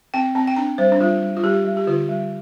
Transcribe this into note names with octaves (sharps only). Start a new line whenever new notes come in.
C4 G5
C4 A#5
G5
D4 A#5
G3 C5
D4
G3 F4
G3
F4
G3 G4
G3
G4
D3 F4
G3